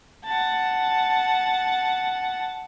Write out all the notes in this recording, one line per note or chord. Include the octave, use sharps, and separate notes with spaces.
F#5 A5